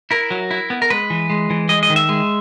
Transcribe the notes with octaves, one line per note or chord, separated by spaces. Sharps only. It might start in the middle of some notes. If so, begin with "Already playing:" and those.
E4 A#4
F#3
E4
B3
A#4
G#3 B4
E3
G#3
E3
G#3 D#5
D#5
D#3
E5
G#3